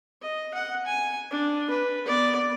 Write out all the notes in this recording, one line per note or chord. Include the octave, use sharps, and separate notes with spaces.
D#5
F#5
G#5
D4
B4
B3 D5